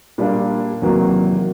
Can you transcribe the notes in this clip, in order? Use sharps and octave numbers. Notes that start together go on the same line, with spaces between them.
A#2 G3 A#3 D4 F4
E2 C3 D#3 F#3 A#3